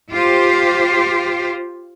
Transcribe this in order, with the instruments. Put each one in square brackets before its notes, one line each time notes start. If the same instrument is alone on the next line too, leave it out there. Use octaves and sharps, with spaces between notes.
[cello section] F4 G4 C5